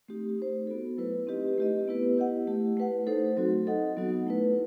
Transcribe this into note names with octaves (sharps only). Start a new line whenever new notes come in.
A3 C4 D#4 G4
D#4 G4 C5
B3 F#4 A4
F#3 A3 E4 B4
C4 D#4 G4 B4 D#5
A3 E4 G4 B4 D#5
B3 E4 G4 B4
E4 G4 D#5 F#5
A3 E4 G4
A3 E4 B4 F#5
A3 D#4 A4 C5
F#3 C4 F#4
D#4 A4 D#5 F#5
F#3 B3 D#4 F#4
A3 E4 B4